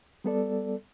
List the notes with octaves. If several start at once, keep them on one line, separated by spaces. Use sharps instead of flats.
G3 B3 A4 D5